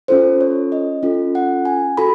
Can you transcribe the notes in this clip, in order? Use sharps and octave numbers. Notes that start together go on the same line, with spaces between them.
C#4 F4 A4 C5
C#5
D#5
C#4 F4 A4
F#5
G#5
F#4 A4 B5